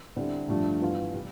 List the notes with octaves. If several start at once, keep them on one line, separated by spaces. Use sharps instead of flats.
D3 G3 C4 E4
G2 D3 F3 A3 D4
G2 E3 B3 F4
C3 G3